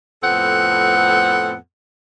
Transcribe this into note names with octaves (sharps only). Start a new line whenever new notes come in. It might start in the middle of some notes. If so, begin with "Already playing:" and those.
F2 A2 B3 C4 A4 F#5